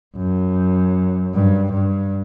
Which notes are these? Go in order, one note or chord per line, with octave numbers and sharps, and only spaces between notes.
F#2
G2
G2